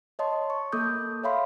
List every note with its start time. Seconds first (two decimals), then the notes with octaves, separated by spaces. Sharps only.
0.19 C#5 D#5 A5 C6
0.50 C#6
0.72 A#3 A4 D6 D#6 G6
1.24 C#5 E5 F5 B5 C6